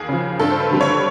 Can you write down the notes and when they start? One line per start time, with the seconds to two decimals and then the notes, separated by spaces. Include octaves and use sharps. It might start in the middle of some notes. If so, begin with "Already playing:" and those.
Already playing: D#2 G#4
0.09 C#3 F3
0.40 G2 A4
0.51 C5
0.60 B4
0.70 D3 G3 C4
0.81 C#5